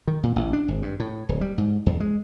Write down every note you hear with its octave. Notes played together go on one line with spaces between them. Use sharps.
D#3
A#2
A1
D4
G#1
G2
A2
D1
G3
G#2
E2
G#3